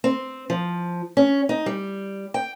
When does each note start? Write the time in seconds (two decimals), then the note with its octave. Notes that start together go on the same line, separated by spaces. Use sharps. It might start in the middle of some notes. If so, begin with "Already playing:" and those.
0.04 C4
0.50 F3
1.17 C#4
1.49 D#4
1.66 G3
2.34 G5